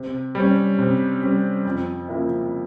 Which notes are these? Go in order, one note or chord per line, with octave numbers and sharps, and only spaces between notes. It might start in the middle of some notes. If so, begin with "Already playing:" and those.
Already playing: C3
G3 C#4
C3
G3 C#4
F2
C#3 F3 A#3 E4